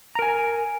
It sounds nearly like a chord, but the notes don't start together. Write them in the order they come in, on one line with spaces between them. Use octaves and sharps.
A#5 A#4 G#5